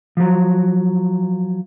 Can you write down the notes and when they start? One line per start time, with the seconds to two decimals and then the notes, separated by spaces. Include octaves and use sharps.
0.17 F3 F#3